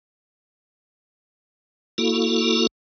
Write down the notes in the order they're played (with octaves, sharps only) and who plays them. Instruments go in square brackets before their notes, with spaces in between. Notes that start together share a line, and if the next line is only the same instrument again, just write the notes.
[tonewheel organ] A#3 E4 F#4 A4